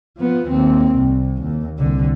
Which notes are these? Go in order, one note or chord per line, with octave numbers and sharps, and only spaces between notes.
F3 B3
D#2 C4
C2
D#2
C2 D3